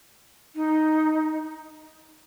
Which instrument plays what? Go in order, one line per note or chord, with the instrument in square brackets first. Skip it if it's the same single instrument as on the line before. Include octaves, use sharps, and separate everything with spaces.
[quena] D#4